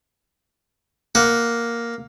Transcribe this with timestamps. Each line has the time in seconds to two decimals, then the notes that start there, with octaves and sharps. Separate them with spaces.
1.15 A#3 F#5